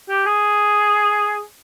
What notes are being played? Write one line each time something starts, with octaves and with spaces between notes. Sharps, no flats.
G4
G#4